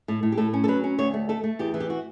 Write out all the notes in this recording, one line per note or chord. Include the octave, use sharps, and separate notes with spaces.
A2
A2
G4
A2 A4
C#4
A4
F#3 B4
C#4
D2 C#5
A3
A3 A4
A3
E2 G4
E3
G4
F#4